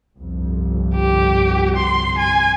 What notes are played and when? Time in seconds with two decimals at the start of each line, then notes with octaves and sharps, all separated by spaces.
0.18 G1 C2 F2
0.95 G4
1.76 C6
2.18 G#5